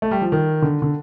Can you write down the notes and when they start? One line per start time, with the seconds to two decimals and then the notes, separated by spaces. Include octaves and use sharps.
0.02 A3
0.11 G3
0.22 F3
0.32 D#3
0.62 D3
0.82 D3